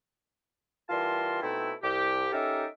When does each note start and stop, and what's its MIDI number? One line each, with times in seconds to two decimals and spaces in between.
0.89 1.40 52
0.89 1.40 55
0.89 1.40 65
0.89 1.40 70
0.89 1.40 81
0.89 1.40 84
1.42 1.71 47
1.42 1.71 57
1.42 1.71 60
1.42 1.71 63
1.42 1.71 64
1.83 2.27 36
1.83 2.27 67
2.32 2.66 61
2.32 2.66 63
2.32 2.66 67
2.32 2.66 69
2.32 2.66 70
2.32 2.66 76